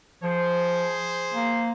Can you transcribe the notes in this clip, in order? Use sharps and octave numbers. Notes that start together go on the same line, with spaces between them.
F3 G#4 C5
A#3